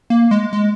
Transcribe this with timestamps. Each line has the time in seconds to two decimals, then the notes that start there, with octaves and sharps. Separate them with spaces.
0.10 A#3
0.31 G#3
0.53 G#3